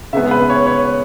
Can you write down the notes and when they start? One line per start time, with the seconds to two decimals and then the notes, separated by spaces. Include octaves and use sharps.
0.13 C#3 G#3 B3 E5
0.31 B4
0.50 C#5
0.67 C#5